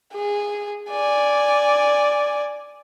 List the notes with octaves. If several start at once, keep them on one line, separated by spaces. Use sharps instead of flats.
G#4
D5 G#5